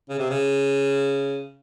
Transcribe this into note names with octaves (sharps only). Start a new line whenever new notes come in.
C#3
C3
C#3